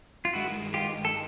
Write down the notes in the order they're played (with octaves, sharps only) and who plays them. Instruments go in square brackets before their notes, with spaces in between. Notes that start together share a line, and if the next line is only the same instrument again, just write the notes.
[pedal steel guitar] F4
[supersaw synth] G2 D#3 G#3 [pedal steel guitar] E4 F#4
[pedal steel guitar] F4 G4
A4